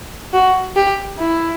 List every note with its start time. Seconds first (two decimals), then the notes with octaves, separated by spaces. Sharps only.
0.33 F#4
0.76 G4
1.19 E4